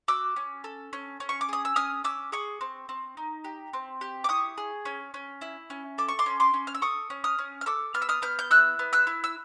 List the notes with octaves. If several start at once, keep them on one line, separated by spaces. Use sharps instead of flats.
F#4 D6 E6
C#4
A4
C#4
C#4
C#6
D6
G#4 D#6
E6
C#4 D#6 F6
C#4 D6 E6
G#4 C#6 D#6
C4
C4
D#4
G4
C4
G4
D6
E4 C#6 D#6
G#4
C#4
C#4
E4
C#4
A4 D6
C#6
C6 D6
C#4
C6 D6
C#4
F6
E6
A4 C#6 D#6
C#4
D#6 F6
C#4
F6
A4 D6 E6
B3 F6
E6
D#6 F6
B3 F6 G6
G6
E4 E6 F#6
B3
E6 F#6
E4
E6